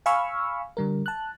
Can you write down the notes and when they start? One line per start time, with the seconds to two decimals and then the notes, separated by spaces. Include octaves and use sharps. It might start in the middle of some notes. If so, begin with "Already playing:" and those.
0.06 F5 G#5 B5 C#6 E6 F6
0.77 D3 G3 A#4
1.06 A5 F#6